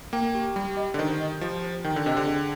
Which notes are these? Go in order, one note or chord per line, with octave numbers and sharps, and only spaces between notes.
A#3 G5
G4
G3 G4
D#5
D3
D#3 C5
D#5
F3 G4
C5
D#3 G5
D3
C3 D#5
D3
G#4